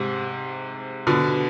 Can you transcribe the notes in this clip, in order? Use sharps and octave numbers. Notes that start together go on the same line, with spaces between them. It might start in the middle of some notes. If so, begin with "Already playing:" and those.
Already playing: G#2 C3
B2 D3